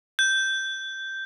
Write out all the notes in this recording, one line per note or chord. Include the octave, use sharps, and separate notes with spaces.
G6